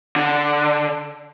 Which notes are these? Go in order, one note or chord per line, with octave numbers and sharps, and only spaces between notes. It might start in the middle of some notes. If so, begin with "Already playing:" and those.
D3